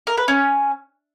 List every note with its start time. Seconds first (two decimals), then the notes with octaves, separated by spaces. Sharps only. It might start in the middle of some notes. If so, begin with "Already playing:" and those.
0.07 A#4
0.17 B4
0.28 C#4